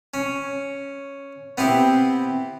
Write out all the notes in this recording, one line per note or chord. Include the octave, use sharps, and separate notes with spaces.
C#4
B3 C4 E4 G4